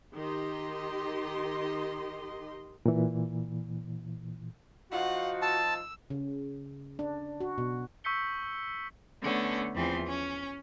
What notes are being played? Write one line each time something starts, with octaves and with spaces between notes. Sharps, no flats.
D#3 G4 D#5 C6
A#2 E3
F3 D#4 F4 F#4 F5 F#5
A5 E6
C#3
D4
F#4
B2
C#6 E6 G6 B6 C#7 G7
D3 A3 B3 C#4
E2 E3 F3 C4 C6
C#4